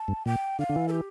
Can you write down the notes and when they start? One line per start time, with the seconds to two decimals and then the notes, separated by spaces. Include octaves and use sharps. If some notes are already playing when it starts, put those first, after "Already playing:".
Already playing: A5
0.08 G2
0.26 A#2 G5
0.59 D3 F5
0.69 D3
0.76 E3
0.88 A4
0.92 G4